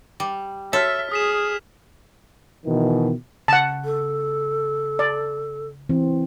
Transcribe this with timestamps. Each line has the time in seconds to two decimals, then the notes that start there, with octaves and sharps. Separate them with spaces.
0.20 G3
0.73 F#4 A4 C#5 E5 F6 B6
1.12 G#4 D#6 B6 E7
2.66 B2 D#3 E3
3.48 C#3 F#5 A5
3.85 A4
4.99 D5
5.89 E3 C4